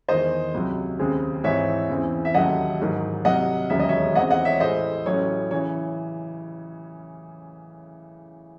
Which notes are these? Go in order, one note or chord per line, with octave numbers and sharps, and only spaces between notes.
E2 D#3 G#3 C5 D#5
C#2 C3 F#3
D#2 C#3 G#3 C4
G#2 E3 C4 C#5 E5
E2 C#3 E3 C4
E5
D#2 C#3 F#3 A3 D#5 F#5
A1 G#2 D#3 F#3
C2 C3 F#3 D#5 F#5
E1 D#2 C#3 F#3 E5
D#5
C#5 E5
E2 C#3 G#3 C4 D#5 F#5
D#5 F#5
C#5 E5
A1 A2 G#3 C5 D#5
A1 A2 F#3 C#4 C#5
C#3 E3 C#5